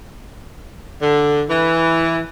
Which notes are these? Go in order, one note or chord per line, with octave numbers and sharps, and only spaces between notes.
D3
E3